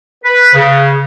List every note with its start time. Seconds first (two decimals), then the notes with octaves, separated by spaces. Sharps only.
0.24 B4
0.54 C#3